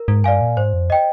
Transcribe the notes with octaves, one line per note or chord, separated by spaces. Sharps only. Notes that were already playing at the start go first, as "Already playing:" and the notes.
Already playing: A#4
G#2
G2 D5 F5 G#5
A#2
G#2 C5
F2
D#5 G5